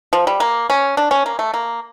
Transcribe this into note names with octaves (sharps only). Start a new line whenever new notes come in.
F3
G3
A#3
C#4
D4
C#4
A#3
A3
A#3